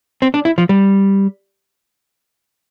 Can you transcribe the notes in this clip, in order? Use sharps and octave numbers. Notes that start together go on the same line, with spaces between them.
C4
D4
E4
F3
G3